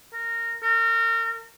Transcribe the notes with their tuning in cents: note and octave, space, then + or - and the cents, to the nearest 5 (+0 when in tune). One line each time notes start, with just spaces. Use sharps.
A#4 -15
A#4 -30